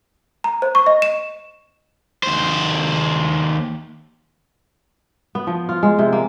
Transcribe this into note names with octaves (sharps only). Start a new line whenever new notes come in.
A#5
C5
C#6
D#5
E7
D#2 C5
B3
F3
F4
G#3
C3
A#3